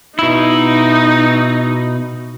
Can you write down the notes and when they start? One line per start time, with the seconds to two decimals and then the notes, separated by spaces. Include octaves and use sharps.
0.19 B2 D#4 E4